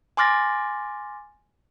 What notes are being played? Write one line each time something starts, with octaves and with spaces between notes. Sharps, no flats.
G#5 C6 D6 F6 A6 A#6